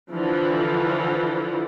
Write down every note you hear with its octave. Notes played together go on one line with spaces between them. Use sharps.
D3 E3 F3